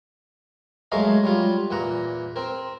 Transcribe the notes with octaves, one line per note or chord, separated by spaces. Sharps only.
F#3 G#3 A3 A#4 D#5 F5
F#3 G3 F4
E2 A#2 F#5 A#5
C4 A#4